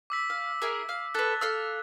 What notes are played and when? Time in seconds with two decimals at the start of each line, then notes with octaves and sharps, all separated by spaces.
0.10 D6 E6 B6
0.30 F5
0.62 E4 G#4 A#4
0.89 F5
1.14 A4 B4 F#6 A6
1.41 A4 F5 E6